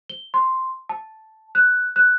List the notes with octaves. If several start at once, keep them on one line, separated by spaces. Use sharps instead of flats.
G7
C6
A5
F#6
F#6